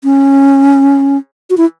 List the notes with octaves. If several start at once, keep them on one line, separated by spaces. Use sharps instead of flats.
C#4
F#4
E4